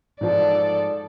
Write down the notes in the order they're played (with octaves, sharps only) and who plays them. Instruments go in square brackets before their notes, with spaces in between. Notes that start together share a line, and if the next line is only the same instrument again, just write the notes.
[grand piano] G#2 F3 [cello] A4 D5